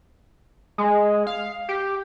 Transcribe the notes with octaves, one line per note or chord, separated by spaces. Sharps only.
G#3
F5
G4